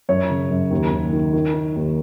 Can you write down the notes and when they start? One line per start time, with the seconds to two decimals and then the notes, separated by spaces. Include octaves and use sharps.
0.09 F#2 C#5
0.30 C#3
0.50 F#2
0.71 D#2
0.91 D#2
1.13 D#3
1.33 D#3
1.54 D#3
1.76 D#2